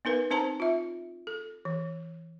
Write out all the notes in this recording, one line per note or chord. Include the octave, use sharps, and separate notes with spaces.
B3 D#4 A#4 B4
C4 D#4 C5 A5 A#5
F4 E5
A4
E3